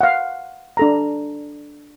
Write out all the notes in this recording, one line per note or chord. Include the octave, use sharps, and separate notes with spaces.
F5 F#5
D4 A4 A#5